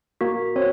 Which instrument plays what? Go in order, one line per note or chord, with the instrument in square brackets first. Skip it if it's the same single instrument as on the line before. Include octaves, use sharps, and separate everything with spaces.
[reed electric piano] A#3 [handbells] F#4
[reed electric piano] C4 [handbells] C#5